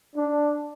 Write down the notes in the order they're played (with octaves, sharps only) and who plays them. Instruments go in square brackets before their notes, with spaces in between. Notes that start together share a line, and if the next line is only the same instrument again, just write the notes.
[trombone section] D4